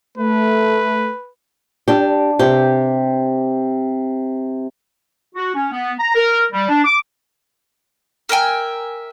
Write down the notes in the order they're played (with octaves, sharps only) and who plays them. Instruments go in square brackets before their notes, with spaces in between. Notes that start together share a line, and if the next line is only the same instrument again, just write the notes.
[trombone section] A3 [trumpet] B4
[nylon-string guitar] D4 G4
[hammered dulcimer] C3 [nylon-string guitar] G4
[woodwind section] F#4
C#4
B3
A#5
A#4
G3
D4
D6
[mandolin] A#4 E5 G5 G#5